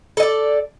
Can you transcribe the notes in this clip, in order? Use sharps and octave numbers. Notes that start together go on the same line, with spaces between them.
A4 D5 D#5